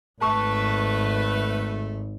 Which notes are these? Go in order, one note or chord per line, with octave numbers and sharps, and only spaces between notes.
G#1 A3 B4 A5 C#6